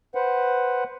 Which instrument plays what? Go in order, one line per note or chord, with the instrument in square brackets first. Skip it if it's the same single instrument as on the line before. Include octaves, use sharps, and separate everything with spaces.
[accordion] B4 C5 F#5